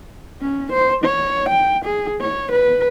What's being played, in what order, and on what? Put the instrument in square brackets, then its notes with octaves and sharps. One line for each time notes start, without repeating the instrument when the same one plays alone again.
[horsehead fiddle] C#4
C5
C#5
G5
G#4
C#5
B4